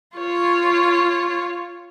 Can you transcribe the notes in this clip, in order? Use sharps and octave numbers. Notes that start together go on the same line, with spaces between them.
F4 C#5